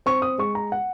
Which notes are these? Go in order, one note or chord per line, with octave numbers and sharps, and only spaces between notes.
C4 C#6
D#6
G#3 C#6
A#5
F#5